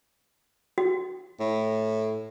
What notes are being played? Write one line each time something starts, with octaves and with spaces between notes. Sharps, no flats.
F#4
A2